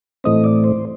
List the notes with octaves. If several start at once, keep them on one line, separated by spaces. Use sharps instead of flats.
A2 E3 A3 C4 D#5
D5
C5